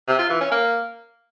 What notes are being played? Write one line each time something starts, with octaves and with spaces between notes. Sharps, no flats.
C3
F4
E3
C#4
A#3